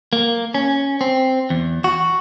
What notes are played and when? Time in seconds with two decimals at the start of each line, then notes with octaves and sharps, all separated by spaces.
0.13 A#3
0.54 C#4
1.01 C4
1.50 E2
1.84 F#4